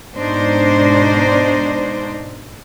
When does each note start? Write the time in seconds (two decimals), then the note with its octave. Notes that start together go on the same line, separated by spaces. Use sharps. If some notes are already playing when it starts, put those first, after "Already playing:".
0.14 G#2 B2 D4 D#4 C5